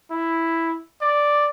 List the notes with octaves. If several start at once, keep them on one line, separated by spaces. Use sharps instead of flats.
E4
D5